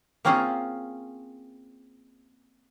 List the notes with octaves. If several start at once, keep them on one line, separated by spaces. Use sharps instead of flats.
A#3 C4 C#4 F4 G#4